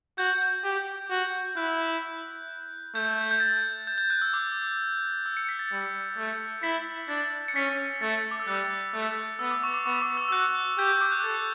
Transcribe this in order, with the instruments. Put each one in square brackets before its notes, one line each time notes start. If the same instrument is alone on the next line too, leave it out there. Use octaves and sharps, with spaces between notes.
[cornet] F#4 [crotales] G6
[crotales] G6
[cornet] G4
F#4
[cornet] E4 [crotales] F#6
[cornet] A3 [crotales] G6
[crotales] G6
A6
G6
G6
F#6
E6
D6
E6
C#7
B6
A6
[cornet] G3
A3
[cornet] E4 [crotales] B6
[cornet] D4 [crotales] A6
[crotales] C#7
[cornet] C#4 [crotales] B6
[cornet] A3 [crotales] A6
[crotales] D6
E6
[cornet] G3 [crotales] F#6
[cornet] A3 [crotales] F#6
[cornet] B3 [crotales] E6
[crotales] D6
C#6
D6
[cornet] B3 [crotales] C#6
[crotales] D6
E6
E6
[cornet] F#4 [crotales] F#6
[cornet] G4 [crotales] G6
[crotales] E6
D6
F#6
[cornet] A4 [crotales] A6